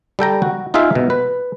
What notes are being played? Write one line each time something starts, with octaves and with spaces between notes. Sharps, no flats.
G3 A4 G5 A#5
F#4
D#4 F4 G#4 E5 F5
B2
B4